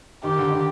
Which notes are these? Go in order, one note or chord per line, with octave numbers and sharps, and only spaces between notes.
D#3 G4
D3
D#3